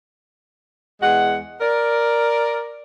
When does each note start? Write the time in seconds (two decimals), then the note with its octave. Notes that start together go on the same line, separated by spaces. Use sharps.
1.02 E2 G#3 F#5
1.61 A#4 D5